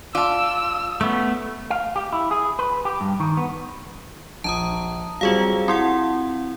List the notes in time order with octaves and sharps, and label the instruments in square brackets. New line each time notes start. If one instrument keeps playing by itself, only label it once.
[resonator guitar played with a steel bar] F4 [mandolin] D5 A5 [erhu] E6
[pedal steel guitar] A3 B3 [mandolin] C#4
[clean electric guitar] F5
G4
E4
G#4
B4
G4
G2
D#3
B3
[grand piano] A#1 [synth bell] A5 A#5 D#6
[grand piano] F#3 G3 C4 [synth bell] F4 G#4 F5
[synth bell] C4 E4 F#5 [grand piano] C6